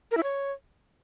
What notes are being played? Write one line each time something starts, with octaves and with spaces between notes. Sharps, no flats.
A#4
E4
C#5